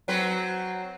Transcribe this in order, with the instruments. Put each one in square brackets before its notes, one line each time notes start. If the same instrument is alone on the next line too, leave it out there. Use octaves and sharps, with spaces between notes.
[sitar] F#3 C4 B4